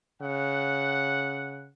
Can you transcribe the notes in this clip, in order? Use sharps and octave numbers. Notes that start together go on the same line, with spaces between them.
C#3 F#5